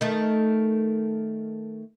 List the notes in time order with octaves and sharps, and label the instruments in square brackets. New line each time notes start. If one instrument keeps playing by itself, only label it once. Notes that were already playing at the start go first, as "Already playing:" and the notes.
[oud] D#3 A3